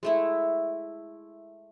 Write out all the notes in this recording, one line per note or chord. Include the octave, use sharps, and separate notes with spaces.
G#3 A3 E4